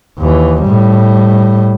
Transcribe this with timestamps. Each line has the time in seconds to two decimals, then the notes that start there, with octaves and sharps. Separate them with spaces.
0.19 D#2 E3
0.62 A2 G3